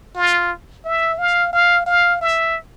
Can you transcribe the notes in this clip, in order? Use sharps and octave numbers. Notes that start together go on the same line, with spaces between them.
F4
E5
F5
F5
F5
E5